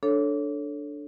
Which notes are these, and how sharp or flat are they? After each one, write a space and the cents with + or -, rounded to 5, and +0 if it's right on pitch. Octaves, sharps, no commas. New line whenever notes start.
D4 +0 A4 +0 C#5 +0